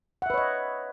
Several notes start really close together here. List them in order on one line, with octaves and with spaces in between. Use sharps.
F#5 E5 B4 C#5 D#5